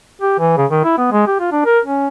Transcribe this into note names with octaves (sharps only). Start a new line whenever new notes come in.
G4
E3
C#3
D#3
E4
B3
G#3
G4
F4
D4
A#4
C#4